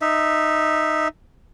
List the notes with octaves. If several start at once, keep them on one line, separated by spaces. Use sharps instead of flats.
D#4 E5